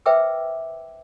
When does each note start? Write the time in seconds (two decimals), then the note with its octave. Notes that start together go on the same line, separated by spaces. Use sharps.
0.06 B4 C5 E5 G5 D6 E6